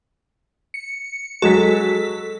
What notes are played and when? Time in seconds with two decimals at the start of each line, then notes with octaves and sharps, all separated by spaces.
0.74 C#7
1.42 F#3 G#3 F#4 A4 B6